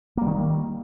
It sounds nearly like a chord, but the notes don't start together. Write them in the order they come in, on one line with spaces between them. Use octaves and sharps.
A#3 G3 D#3